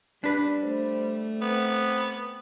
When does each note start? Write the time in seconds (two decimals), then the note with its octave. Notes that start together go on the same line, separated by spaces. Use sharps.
0.24 G3 D4 B4
0.63 A3 C5
1.41 B3 C4